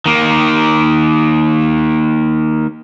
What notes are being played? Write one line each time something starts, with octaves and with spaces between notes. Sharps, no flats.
D#3 A#3